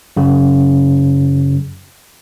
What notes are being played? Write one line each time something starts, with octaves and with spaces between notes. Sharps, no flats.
F#2 C#3